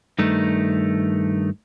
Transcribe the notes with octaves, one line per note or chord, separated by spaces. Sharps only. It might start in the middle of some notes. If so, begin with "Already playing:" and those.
G2 D#3 A3 D#4